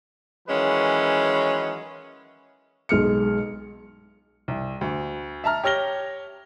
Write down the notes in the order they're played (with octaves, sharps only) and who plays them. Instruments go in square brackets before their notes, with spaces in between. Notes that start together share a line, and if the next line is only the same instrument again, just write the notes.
[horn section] D#3 E3 F#3 G#3 C#4 B4
[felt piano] B1 G#3 F6 C#7
[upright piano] C2
D2
E5 A5 A#5 F6
G4 C#5 F6 A#6 G7